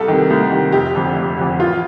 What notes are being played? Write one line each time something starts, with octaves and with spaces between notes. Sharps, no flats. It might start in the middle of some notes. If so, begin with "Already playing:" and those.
Already playing: C2 A4
C3 D#3
C2
C3 D#3
F1 G4
F2 D3
F1
F2 D3
A1 F4